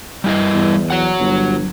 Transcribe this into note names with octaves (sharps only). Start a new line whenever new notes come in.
G3 E4 D#5
E2
F#3 F#5
G1